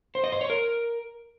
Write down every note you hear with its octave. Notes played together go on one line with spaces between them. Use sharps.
C5
D#5
C5
C#5
A#4